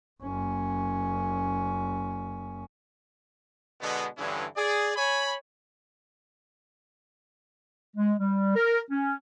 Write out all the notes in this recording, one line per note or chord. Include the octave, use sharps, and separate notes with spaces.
F#1 C#4
B2 D3 G#3 B3
G2 D3 E3 C#4 E4 G#4
G#4 D5
C#5 G#5 B5
G#3
G3
A#4
C#4